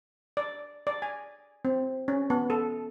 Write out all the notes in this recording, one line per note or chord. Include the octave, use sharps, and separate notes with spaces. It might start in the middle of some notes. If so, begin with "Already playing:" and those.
D5
D5
G#5
C4
C#4
B3
A4